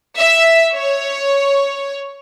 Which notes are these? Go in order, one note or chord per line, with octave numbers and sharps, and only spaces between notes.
E5
C#5